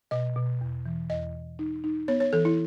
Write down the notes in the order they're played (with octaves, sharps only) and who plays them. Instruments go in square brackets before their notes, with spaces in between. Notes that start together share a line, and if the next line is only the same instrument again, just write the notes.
[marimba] B2 [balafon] D#5
[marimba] B2
E2
E3
[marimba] E2 [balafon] D#5
[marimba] E2
D#4
D#4
[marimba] B3 [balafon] C#5
[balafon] C#5
[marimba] E3 [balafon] A4
[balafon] E4